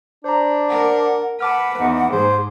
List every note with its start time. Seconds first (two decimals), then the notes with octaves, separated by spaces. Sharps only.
0.24 D4 C5 A#5
0.69 A#4 F#5
1.41 B4 F#5 A5 D6 F6
1.79 E2 D#4
2.12 G#2 G#4 C5